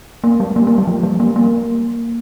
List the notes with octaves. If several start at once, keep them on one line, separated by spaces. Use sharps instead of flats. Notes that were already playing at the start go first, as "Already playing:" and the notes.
A#3
G3
A#3
A#3
G3
F3
G3
A#3
A#3